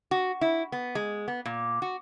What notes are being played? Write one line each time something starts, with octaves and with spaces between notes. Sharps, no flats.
F#4
E4
B3
G#3
B3
A#2
F#4